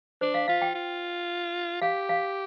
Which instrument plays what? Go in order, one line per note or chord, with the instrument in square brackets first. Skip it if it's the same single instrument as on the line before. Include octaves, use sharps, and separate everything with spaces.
[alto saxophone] D4 [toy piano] C5
[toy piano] F5
[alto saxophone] F4 [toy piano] F5
[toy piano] G5
[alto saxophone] F4
[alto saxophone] G4 [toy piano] F5
[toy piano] F5